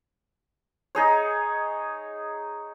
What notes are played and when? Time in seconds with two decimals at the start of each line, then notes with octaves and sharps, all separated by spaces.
0.95 D#4 G#4 C#5